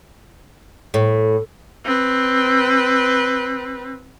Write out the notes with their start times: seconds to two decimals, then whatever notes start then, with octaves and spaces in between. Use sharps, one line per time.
0.94 A2
1.84 C4 B4